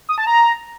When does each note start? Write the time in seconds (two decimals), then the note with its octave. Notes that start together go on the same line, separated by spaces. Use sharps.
0.09 D#6
0.18 A5
0.27 A#5